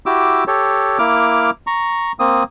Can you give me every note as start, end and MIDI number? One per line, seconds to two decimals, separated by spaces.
0.06 0.44 64
0.06 0.44 66
0.06 0.44 67
0.06 0.44 86
0.06 0.44 88
0.47 0.98 67
0.47 0.98 69
0.47 0.98 73
0.99 1.50 58
0.99 1.50 64
0.99 1.50 86
0.99 1.50 89
1.67 2.12 82
1.67 2.12 85
2.19 2.44 58
2.19 2.44 60
2.19 2.44 87